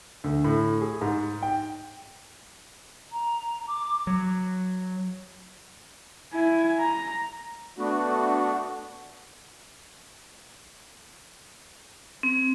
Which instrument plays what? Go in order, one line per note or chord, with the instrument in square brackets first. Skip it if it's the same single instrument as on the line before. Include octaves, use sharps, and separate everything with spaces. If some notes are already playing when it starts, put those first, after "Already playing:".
[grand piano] D2
A2
G#4
G#2
G5
[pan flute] A#5
D6
[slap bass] F#3
[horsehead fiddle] E4 G#5
A#5
[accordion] A3 B3 D4 F#4
[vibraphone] C4